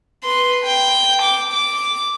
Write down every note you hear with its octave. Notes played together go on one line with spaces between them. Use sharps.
B4 C6
G5
D6
D6